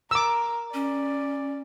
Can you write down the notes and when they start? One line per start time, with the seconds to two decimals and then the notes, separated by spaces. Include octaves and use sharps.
0.11 A#4 D6 E6
0.74 C#4 D5